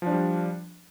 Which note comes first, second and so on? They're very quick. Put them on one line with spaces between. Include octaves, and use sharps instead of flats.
F3 D4 G3